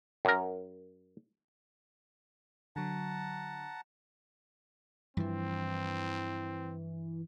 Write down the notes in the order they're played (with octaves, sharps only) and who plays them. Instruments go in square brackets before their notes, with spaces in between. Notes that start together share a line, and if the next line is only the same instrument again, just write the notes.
[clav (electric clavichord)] F#2 A#4
[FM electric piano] D3 F#3 [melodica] F#5 A5 A#5
[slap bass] G2 F3 [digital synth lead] E3 [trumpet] C4